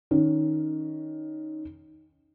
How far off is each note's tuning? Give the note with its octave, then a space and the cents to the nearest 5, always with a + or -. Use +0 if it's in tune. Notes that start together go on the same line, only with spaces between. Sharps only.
D#3 +0 C#4 +10